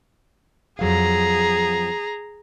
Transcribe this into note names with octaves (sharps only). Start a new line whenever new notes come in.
F2 F#3 G#4 F5 A#5